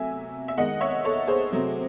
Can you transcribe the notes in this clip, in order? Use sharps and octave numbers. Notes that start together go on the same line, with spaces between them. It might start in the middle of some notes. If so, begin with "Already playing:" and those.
Already playing: C3 F#3 A3 E5 G#5
E5
D#3 G#3 D#5 F#5
C#5 E5
A4 C#5
G#4 C5
C3 F#3 A3